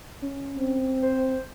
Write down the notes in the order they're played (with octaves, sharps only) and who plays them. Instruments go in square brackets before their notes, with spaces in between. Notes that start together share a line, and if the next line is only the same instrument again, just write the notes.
[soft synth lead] C#4
[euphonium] C4
[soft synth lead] C5